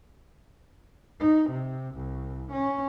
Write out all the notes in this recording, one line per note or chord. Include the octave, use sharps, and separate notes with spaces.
D#4
C3
C2
C#4